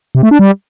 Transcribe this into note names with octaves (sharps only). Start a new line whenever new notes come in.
C3
A3
D4
G3